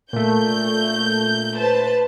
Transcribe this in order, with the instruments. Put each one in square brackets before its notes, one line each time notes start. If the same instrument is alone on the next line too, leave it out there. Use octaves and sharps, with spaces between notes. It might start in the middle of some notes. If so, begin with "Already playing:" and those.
[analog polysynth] A#2 A3 [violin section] G6
[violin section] B4 C5 A5